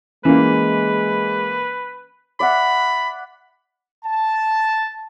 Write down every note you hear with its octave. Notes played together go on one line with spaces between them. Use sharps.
E3 G#3 A#3 C#4 B4
D5 E5 F#5 B5
A5